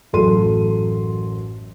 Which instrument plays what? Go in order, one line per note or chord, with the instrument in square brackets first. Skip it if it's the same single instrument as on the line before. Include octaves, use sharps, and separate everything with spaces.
[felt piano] A1 F#2 F#3 A4 C6 D#7